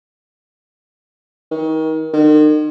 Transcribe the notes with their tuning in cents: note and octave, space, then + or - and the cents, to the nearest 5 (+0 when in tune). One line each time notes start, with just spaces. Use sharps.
D#3 +30
D#3 -40